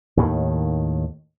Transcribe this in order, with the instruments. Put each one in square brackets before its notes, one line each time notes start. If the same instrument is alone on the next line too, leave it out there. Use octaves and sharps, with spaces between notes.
[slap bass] D#2 A2 D#3